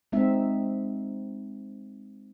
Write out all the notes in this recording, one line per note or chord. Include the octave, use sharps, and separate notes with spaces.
G#3 C4 D#4 E5